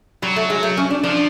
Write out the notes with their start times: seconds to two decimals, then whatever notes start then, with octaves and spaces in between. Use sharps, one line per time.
0.22 F#3 G3
0.36 A3
0.50 G#3
0.63 A3
0.77 C#4
0.90 D4
1.04 F3 D4